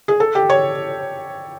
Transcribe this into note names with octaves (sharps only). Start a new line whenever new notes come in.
G#4
A4
G4
C#5